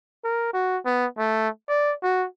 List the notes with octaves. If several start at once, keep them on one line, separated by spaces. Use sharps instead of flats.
A#4
F#4
B3
A3
D5
F#4